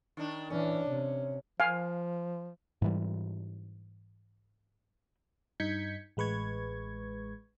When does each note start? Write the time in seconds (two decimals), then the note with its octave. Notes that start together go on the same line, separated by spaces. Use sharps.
0.17 D#3 D4
0.50 E3 C#4 D4
0.90 C3
1.60 F3 F5 G#5
2.82 G#2 E3 G3
5.60 G2 D#4 G6 G#6 B6 C#7
6.17 A1 G#3 B4 C#6 G#6